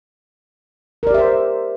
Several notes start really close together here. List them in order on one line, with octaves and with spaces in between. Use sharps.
A#4 D5 G4 E5 C5